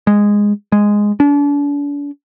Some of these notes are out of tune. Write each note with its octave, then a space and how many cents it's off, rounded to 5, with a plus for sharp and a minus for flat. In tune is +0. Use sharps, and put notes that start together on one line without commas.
G#3 -10
G#3 -5
D4 -40